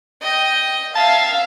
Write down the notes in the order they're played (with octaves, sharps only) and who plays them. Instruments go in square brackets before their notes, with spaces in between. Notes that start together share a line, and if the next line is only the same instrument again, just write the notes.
[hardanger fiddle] D#5 G5
[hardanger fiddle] E5 [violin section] F5 [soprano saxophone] A5